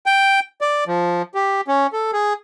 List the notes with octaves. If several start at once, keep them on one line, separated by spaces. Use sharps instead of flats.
G5
D5
F3
G4
C#4
A4
G#4